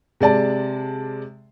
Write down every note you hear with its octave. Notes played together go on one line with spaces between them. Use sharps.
C3 G#3 D5 A5